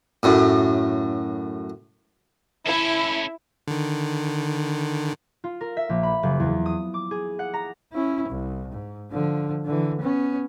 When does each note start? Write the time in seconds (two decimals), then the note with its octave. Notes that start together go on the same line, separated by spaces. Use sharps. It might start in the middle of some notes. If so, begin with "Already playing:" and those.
0.23 F#2 A2
2.67 C#4 E4 A4
3.68 D3 D#3
5.44 F4
5.61 A#4
5.77 E5
5.89 A#1
6.03 B5
6.23 F#1
6.40 E2
6.66 D#6
6.94 D6
7.11 G#4
7.39 F#5
7.54 A#5
7.93 C#4 E4
8.29 C2
8.72 G#2
9.12 D3 F3
9.65 D3 E3
10.01 B3 C#4